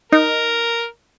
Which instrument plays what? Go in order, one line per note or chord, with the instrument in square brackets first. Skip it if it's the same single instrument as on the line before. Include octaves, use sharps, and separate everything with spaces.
[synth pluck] D#4 [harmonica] A#4